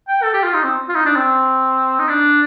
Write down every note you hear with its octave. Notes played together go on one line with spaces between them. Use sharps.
G5
A4
G4
F4
D#4
C4
F4
D#4
D4
C4
D#4
D4